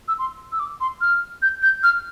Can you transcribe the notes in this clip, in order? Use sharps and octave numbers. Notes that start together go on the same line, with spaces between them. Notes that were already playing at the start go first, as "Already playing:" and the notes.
E6
C6
E6
D6
C6
F6
G6
G6
F6